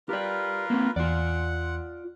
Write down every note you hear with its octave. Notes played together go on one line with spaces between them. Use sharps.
F4 G4 A#4 B4 D5
A#3 C4
E2 F4 D5 F#5 C6